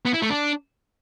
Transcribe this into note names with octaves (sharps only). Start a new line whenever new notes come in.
B3
E4
A3
D4